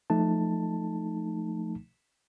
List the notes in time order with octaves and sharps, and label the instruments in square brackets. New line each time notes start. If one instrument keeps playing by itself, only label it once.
[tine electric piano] F3 A3 D#4 A5